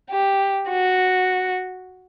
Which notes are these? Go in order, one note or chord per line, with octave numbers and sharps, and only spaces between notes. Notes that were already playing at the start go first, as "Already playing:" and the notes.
G4
F#4